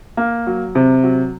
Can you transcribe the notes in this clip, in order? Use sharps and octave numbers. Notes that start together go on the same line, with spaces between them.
A#3
F#3
C3
F#3